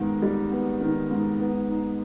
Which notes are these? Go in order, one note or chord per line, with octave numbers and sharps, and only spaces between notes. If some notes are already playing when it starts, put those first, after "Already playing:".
Already playing: G#2 D#3 B3
G3
B3
D#3
G#2
B3
D#4